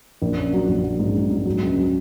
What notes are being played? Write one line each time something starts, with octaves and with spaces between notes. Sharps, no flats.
A#1
C#4
F#3
A#1
F#3
G#2
G#2
G#2
F#3
C#2
F#3